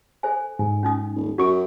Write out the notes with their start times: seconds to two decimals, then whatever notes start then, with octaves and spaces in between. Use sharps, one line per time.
0.23 A4 C5 G#5
0.59 G#2 G#5
0.83 C#4 D#4 D#6
1.15 D#1
1.38 F#2 F#4 C#6 D7